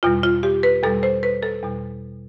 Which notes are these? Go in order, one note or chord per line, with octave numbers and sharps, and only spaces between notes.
E2 B2 G3 F4
F4
G4
B4
E2 B2 G3 A4
C5
B4
A4
E2 B2 G3